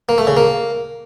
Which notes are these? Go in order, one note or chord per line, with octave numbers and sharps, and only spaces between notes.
A#3
A3
C#3
A#3